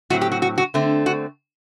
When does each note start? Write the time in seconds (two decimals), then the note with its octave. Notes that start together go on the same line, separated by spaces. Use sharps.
0.10 A2 F#3 C4 F#4
0.21 G4
0.32 F#4
0.42 F#4
0.58 F#4
0.74 D3 A3 C4
1.06 F#4